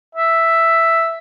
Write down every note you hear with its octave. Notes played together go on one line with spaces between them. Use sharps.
E5